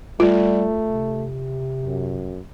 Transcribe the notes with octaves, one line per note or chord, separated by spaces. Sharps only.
G3 A3 F4
C3
F#2